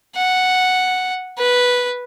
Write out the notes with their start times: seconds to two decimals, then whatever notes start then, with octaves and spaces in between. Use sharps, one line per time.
0.16 F#5
1.38 B4